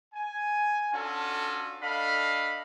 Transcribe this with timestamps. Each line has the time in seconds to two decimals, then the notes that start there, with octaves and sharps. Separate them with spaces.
0.14 G#5
0.93 C#4 D4 F4 F#4 A4
1.81 D4 A4 D#5 F5 B5